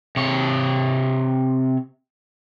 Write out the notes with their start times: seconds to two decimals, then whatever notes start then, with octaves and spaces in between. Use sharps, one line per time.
0.16 C3 C#5